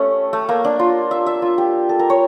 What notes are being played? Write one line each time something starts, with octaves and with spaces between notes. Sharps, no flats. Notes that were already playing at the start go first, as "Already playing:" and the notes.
Already playing: A3 C#4 G4
A3
A#3
D4
F4
E5
E5
F4
G4
A4
A#4
C#5